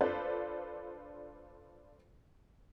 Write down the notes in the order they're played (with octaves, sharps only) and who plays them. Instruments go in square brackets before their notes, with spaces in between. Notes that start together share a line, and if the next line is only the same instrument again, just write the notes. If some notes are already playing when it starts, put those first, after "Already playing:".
[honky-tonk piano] D4 F4 A4 B4 C5 D5